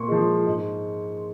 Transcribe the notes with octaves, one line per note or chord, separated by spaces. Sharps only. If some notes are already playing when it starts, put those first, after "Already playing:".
Already playing: A#2 C6 C#6
F3 G#3
G#2